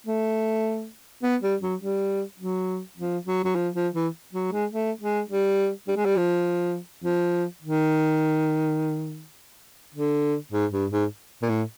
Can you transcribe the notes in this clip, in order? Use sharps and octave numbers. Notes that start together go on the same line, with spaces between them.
A3
B3
G3
F#3
G3
F#3
F3
F#3
F#3
F3
F3
E3
F#3
G#3
A3
G#3
G3
G3
G#3
G3
F3
F3
D#3
D3
G#2
G2
G#2
A#2
A2